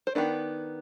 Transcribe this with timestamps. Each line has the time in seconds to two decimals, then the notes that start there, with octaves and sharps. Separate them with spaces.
0.07 C5
0.15 D#3 B3 D4 B4